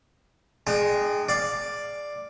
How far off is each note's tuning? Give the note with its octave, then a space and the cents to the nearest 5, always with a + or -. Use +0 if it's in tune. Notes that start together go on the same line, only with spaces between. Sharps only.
G#3 +0 D4 +45 G5 +0
D5 +5 F5 +0